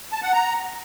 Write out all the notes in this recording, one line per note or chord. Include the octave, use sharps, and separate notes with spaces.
A5
F#5
A#5